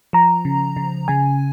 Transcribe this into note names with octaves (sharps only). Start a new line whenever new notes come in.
F3 A#5
C#3
C#3
C#3 G#5